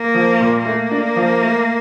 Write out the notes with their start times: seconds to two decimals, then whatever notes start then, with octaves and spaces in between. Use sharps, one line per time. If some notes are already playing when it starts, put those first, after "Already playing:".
Already playing: A#3
0.14 F3
0.40 A#2
0.66 A3 A#3
0.91 D4
1.16 F3
1.42 A3